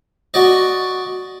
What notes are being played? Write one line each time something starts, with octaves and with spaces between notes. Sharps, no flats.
F#4 D5 D#5